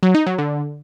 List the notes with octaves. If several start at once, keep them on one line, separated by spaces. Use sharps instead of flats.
F#3
D#4
F#3
D3